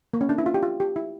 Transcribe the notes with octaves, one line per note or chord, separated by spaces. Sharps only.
A#3
C#4
D4
E4
F4
G4
F4
G4
E4